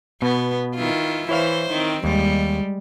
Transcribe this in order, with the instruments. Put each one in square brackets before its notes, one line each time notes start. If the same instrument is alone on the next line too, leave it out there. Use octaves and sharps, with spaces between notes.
[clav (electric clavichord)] B2 [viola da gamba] B3
[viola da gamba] D#3 E4 F4
[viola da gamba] E3 C5 [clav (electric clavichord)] E4 C#5 F5
[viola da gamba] D#3 C4
[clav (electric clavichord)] D#2 [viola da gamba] G3 G#3